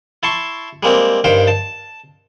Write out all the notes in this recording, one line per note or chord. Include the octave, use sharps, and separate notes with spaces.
E4 A5 C6 C#6
G3 G#3 A#3 C4
G2 D#3 C5 F5 G5
A5